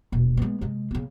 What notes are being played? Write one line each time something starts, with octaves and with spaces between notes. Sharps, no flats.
D#1 B2
G#3 B3
C3 G#3
C#3 B3